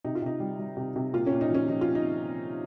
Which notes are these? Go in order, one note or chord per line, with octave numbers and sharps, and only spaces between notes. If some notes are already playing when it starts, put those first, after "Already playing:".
C3 D#4
F4
C3 D#4
G3
G3
C3
C3
A#2 F4
C#4
A#2
D#4
F3 C#4
F3 D#4
F4
A#2
D#4